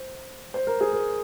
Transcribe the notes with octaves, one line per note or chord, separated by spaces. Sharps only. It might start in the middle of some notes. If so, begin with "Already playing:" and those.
Already playing: C5
C5
A#4
G#4
A#4